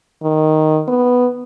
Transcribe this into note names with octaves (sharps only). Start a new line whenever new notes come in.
D#3
B3